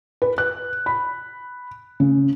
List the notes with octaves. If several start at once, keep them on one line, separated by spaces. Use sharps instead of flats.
B4
F#6
B5
C#3